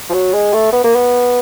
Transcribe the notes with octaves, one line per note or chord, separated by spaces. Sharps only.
F3
F#3
G#3
A3
B3
A#3
B3